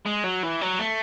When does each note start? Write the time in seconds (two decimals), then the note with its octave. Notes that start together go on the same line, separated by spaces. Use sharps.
0.06 G#3
0.24 F#3
0.43 E3
0.61 F#3
0.79 A3